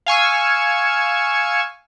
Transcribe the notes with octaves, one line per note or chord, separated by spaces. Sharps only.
F5 G#5 C#6 E6